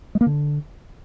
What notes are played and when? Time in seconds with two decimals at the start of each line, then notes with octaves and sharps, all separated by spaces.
0.15 G#3
0.21 A#3
0.26 D3